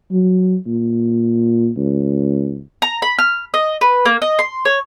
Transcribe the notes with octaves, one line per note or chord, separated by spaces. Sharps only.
F#3
A#2
C#2
A#5
B5
F6
D#5
B4
A#3
D#5
C6
C#5